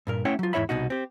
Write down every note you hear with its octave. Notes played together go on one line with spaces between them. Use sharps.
G2 A#2 A#4
A3 C#4 E4 C#5 F#5 G5
F#3 F4
E2 G#2 E4 C#5 E5 B5
C2 B2 D#4 F#4
C4 G4